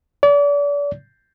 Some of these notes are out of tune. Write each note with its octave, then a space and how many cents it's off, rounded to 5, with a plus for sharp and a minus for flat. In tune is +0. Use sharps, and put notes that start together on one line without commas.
D5 -35